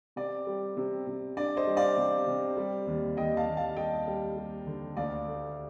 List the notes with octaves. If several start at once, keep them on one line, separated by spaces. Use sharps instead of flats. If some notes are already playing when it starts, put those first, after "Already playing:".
C3 D5
G3
C3
C3
D4 D5
C5 D#5
G3
D5 F5
C3
C3
G3
D#2
D#2 D#5 G5
F5 A5
D#2
F5 A5
G3 D#5 G5
G3
G3
D3
D2 D5 F5
A3